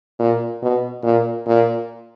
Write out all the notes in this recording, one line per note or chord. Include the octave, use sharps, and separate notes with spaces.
A#2
B2
A#2
A#2